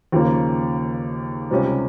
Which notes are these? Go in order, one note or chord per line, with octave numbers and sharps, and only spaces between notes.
D#2 C#3 F3 A#3
C#2 C3 G3 C#4